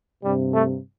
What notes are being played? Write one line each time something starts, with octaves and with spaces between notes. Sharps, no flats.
G2 C3 G3
A3